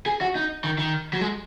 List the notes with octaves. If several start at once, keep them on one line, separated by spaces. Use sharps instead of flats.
G#4
F#4
D#4
D#3
D#3
F#3
G#3